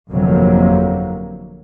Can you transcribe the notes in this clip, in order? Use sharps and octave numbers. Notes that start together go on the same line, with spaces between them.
G1 F2 C3 F#3 A#3